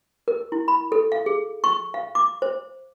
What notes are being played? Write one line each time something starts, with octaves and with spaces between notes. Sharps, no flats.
A#4
E4
B5
A4
F5
G#4
C#6
F5
D6
C5